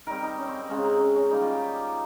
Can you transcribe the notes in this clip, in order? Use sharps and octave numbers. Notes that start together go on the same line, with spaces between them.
D#3 G3 C4 A#4
D#4
C#4
C4
C4
C#3 G#3 C4 C#4
D#4
C#4
C#4
D#3 G3 A#3 D#4
F4
G4